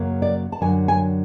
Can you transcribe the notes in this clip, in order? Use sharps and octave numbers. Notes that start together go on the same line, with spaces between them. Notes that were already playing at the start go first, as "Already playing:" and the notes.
Already playing: F#2 C#3 F#3 A#3
D5
A5
F#2 D3 F#3 G#5
G#5